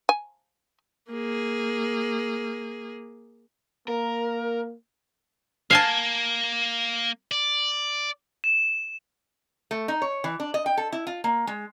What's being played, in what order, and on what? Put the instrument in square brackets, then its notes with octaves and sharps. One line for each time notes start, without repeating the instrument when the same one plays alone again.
[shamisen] G#5
[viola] A#3 G#4
[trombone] A#3 [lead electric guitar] A#4
[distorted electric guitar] A#3 [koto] F5 G#5 A5
[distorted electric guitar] D5
[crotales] E7
[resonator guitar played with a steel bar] A3
D#4
C#5
E3
D4
D#5
G5
A4
E4
F4
A#3
G#3